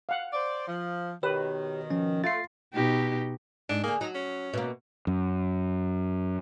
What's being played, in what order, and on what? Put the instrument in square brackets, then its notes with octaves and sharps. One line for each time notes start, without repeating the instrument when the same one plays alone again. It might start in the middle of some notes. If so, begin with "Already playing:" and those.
[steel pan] F5 F#5
[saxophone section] C5 D5
F3
[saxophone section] B2 D#3 [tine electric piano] G4 C#5 [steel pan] B4
[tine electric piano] F3 C#4
[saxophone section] A3 [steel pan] F4 [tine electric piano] A6 C7
[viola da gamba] B2 D#4 G4
[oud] G#2 [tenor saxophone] D4
[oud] D3 G#4 [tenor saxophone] A#3
[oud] F#3 [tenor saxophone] D#4
[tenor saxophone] C#4
[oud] B2 A#3
[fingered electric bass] F#2